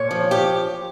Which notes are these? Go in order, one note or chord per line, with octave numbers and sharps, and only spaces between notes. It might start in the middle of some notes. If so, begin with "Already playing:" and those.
Already playing: A#2 C#5
F3
G4